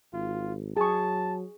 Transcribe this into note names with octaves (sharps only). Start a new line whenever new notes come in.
G#1 F4
F#3 G#4 A5 C#6